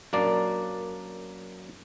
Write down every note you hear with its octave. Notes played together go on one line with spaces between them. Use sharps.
F#2 A#3 D4 D5